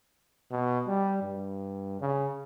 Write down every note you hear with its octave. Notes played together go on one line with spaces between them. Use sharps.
B2
G3
G2
C#3